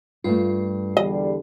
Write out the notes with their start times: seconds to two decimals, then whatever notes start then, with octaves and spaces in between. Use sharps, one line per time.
0.24 G2 A3 F4
0.97 E2 D3 G3 D#5